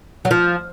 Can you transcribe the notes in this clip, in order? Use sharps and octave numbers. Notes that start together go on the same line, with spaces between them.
F#3
F3